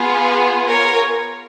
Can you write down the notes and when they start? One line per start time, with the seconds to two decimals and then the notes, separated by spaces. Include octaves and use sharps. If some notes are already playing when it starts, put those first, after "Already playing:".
Already playing: B3 F4 G#4
0.68 A#4 C#5